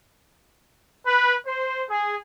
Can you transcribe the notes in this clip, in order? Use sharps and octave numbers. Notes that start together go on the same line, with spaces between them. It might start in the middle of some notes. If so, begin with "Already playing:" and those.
B4
C5
G#4